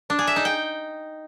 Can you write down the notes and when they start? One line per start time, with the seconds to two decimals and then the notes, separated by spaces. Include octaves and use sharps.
0.10 D4
0.19 G#4
0.27 E5
0.36 D#4
0.45 G5